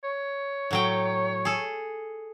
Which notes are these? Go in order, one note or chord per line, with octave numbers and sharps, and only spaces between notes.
C#5
A2 F#3 G5
G#4 A4